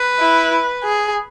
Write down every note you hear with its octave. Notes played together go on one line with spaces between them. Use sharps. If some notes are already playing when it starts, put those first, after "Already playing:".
Already playing: B4
E4
G#4